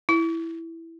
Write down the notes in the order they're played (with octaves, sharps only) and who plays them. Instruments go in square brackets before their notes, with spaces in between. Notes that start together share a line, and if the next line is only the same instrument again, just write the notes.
[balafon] E4